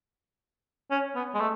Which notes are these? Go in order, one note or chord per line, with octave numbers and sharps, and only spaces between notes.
C#4
B3
G#3
A3